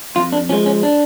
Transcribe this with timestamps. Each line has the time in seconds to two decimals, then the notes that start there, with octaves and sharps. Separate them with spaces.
0.16 F2 F4
0.32 D4
0.49 F3 G#3 C#4
0.66 C#4
0.83 D4